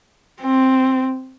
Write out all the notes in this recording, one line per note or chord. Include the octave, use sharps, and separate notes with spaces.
C4